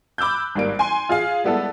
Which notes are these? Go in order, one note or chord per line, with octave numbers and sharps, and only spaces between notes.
B5 D6 E6 F#6 G6
G#1 G3 A#3 D7
G#5 C6
F4 G#4 F5
G3 G#3 B3 E4 A4